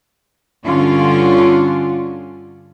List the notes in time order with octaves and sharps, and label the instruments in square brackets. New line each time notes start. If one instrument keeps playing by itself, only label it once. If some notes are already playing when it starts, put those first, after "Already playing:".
[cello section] G2 D3 C#4 D4 F4